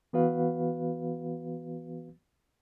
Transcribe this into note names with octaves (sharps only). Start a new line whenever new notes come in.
E3 B3 F#4 B4 F5